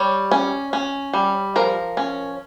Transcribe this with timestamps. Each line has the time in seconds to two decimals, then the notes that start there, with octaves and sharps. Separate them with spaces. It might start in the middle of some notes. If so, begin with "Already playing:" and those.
Already playing: G3 C#5
0.31 C#4
0.73 C#4
1.13 G3
1.56 F3 A#4
1.97 C#4